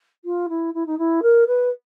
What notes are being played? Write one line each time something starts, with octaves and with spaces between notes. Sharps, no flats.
F4
E4
E4
D#4
E4
A#4
B4